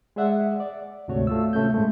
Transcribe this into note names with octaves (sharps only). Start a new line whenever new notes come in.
G#3 G#4 D5 E5 F#5
D5
D2 G#2 C3 A3 F#4 C#5
A3 F4 E6
C3 A3 C#4 G6
A2 G#3 A3